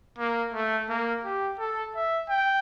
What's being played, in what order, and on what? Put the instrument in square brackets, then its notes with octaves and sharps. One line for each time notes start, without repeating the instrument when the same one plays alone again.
[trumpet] A#3
A3
A#3
G4
A4
E5
G5